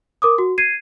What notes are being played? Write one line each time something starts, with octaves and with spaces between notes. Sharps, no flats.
A#4 D6 D#6
F#4
G#6 C7 D#7